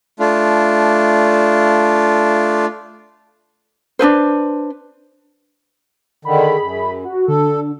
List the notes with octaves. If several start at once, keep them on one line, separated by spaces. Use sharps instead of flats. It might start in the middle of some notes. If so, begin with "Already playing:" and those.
A3 D4 F4
D4 D#4 B4 C5
D3 D#3 G#4 B5
F#2
F#4
D3 A4